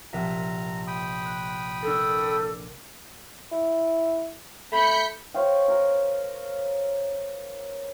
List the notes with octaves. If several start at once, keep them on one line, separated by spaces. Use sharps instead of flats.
A#1 C3 E5 A#5
G5 B5 D#6
F#6
D4 A4 A#4
E4
A3 B5 G6 B6 C#7
C5 C#5 F5 G5
A#4